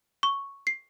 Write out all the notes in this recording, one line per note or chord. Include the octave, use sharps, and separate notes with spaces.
C#6
C7